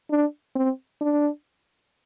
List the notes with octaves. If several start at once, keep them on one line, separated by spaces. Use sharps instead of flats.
D4
C4
D4